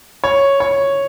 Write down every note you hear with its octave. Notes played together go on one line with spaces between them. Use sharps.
C#5
C#5